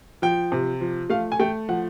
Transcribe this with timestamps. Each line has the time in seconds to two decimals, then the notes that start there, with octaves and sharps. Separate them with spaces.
0.22 F3 G5
0.52 C3
0.81 F3
1.10 A3 F5
1.32 G#5
1.39 A3 G5
1.69 F3 F#5